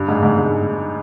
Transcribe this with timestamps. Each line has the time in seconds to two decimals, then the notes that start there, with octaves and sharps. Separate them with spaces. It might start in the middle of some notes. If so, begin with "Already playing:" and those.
Already playing: G2
0.08 G#2
0.23 G#2
0.38 G#2